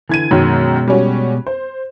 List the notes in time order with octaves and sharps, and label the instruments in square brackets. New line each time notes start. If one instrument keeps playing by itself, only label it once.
[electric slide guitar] D3 [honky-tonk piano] E3 G#6 D#7
[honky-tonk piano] F#2 D#3 F#3 [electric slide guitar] B2 G#3
[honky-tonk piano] G3 C#4 F#4
C5